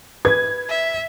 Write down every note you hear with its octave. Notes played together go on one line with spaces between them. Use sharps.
B4 G#6
E5